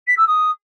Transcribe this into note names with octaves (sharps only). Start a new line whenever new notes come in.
B6
E6
D#6